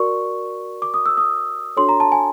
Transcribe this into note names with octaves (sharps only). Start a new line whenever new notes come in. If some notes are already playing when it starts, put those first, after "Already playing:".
Already playing: F#4 A#4 D5 C#6
D6
D#6
E6
D#6
D4 F#4 A4 C#5 C6
A#5
A5
G#5